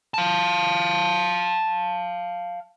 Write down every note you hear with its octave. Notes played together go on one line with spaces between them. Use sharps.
F5 A5